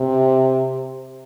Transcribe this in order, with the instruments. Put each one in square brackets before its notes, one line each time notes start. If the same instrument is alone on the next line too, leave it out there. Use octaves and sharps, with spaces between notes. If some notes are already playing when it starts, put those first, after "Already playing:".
Already playing: [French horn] C3